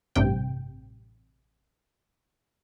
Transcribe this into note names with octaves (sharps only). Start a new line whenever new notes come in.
A1 G2 C3 G5